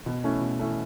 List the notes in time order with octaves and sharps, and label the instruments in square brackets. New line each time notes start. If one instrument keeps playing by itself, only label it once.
[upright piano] B2
A3 C#4 E4
B2
A3 C#4 E4